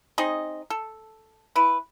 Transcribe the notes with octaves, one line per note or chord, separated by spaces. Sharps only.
C4 D#4 G#4 D#5
A4
E4 B4